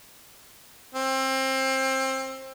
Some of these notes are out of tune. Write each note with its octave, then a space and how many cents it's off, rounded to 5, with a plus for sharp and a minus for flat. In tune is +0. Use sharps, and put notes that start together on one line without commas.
C4 +25